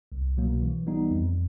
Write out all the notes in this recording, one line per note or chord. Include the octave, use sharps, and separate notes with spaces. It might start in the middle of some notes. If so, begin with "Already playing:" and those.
C2
B2 F#3 A#3
E3
G3 B3 D#4
F2